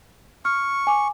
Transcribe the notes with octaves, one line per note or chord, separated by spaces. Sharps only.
C#6 F6
G#5 D6